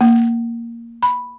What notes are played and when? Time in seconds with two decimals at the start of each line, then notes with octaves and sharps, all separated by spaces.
0.01 A#3
1.03 B5